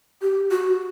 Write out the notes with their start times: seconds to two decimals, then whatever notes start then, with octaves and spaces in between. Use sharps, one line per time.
0.22 G4
0.51 F#4